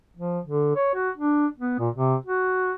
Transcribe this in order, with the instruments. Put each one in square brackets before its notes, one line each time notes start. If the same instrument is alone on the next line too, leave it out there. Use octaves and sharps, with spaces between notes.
[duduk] F3
D3
C#5
F#4
D4
B3
A#2
C3
F#4